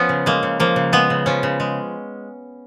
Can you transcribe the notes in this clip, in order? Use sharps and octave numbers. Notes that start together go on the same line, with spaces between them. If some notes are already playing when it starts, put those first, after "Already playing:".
Already playing: F3 B3 C#4
C#3
G#3 A#3
C#3
F3 A#3
C#3
G#3 B3
C#3
F3 C#4
C#3
G#3